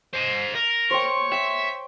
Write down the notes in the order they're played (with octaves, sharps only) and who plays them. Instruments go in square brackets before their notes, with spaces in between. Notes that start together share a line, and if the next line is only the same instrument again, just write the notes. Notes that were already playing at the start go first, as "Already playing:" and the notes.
[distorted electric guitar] C5 D#5
A#4
[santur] C5 G5 [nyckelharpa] C#5 C#6
[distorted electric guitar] E5 [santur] G5